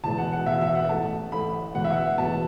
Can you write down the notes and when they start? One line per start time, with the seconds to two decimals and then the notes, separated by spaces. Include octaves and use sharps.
0.04 E1 E2 B2 A5
0.18 F#5
0.32 F#5
0.46 E1 E2 B2 E5
0.61 E5
0.75 F#5
0.89 A1 A2 A3 A5
1.32 A1 A2 A3 B5
1.75 E1 E2 B2 F#5
1.84 E5
1.93 F#5
2.18 E1 E2 B2 A5